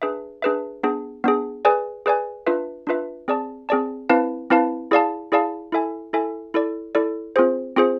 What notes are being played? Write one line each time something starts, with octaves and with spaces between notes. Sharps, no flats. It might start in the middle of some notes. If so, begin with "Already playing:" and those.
D4 G#4 B4 E5
D4 G#4 B4 E5
B3 D4 G#4
B3 D4 G#4
G#4 B4 D5 G#5
G#4 B4 D5 G#5
D4 F4 B4 E5
D4 F4 B4 E5
C4 G#4 D5 A5
C4 G#4 D5 A5
C4 E4 B4 F5 A5
C4 E4 B4 F5 A5
E4 G#4 D5 F5 A5
E4 G#4 D5 F5 A5
E4 A4 E5 G#5
E4 A4 E5 G#5
E4 A4 D5
E4 A4 D5
C4 F4 G#4 C5
C4 F4 G#4 C5